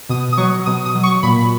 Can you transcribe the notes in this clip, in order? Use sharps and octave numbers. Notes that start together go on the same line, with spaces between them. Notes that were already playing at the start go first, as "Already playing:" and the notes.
B2 D#6
D#6
F#3 C#6
B2 D#6
D#6
F#3
C#6
A#2 B5